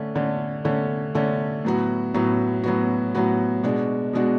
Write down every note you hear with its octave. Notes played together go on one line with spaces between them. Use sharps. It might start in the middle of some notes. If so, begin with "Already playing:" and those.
Already playing: D3 A3 C#4
D3 A3 C#4
D3 A3 C#4
D3 A3 C#4
A2 F#3 B3 F#4
A2 F#3 B3 F#4
A2 F#3 B3 F#4
A2 F#3 B3 F#4
B2 G#3 D4 F#4
B2 G#3 D4 F#4